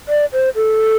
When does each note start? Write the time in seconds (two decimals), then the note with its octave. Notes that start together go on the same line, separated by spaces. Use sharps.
0.09 D5
0.33 C5
0.56 A4